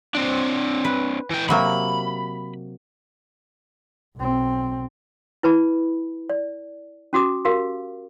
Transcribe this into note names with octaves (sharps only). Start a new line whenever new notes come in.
C4 D4
B4
E3 G5
C3 F#3 A#3 B5
B1 C4
E4 B4 A5 B5
D5
C#4 F#4 D6 D#6
F#4 G4 A#4 F5